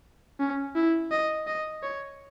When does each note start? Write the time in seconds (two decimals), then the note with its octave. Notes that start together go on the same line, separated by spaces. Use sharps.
0.40 C#4
0.75 E4
1.11 D#5
1.47 D#5
1.83 C#5